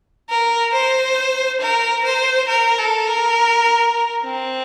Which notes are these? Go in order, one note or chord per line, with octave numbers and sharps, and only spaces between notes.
A#4
C5
A#4
C5
A#4
A4
A#4
C4